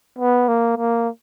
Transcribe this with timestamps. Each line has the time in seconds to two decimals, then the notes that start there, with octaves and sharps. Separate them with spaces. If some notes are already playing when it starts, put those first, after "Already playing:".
0.18 B3
0.48 A#3
0.78 A#3